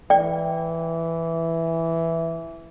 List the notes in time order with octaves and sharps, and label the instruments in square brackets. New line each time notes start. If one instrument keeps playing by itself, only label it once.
[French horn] E3 [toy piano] D5 G5